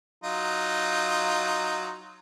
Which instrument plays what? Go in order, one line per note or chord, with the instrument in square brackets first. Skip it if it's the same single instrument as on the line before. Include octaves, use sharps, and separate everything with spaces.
[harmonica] F#3 D#4 F4